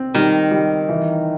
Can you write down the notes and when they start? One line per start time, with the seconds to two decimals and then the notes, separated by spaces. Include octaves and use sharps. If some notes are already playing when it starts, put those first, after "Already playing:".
Already playing: C4
0.14 D#3 G3
0.51 G3
0.89 E3